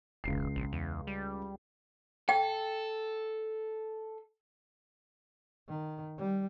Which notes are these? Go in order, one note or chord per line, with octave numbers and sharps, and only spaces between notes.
E1 C#2 C7
A#1
E2
G3
A4 G5
D#3
G3